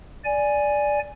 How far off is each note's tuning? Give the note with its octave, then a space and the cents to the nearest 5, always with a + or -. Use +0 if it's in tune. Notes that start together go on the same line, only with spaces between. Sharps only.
D5 +0 G#5 +0